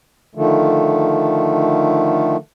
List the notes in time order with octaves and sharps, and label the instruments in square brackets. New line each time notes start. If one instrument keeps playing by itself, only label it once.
[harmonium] D3 D#3 F3 A3